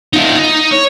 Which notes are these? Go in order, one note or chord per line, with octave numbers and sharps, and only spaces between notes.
D#4 F4
D#4
C#5